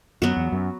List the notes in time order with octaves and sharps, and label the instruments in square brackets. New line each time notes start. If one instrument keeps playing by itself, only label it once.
[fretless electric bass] F#2 [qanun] F#3 B3 F#4
[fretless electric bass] E2
F#2